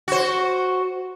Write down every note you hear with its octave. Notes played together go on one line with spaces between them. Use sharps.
F#4 C5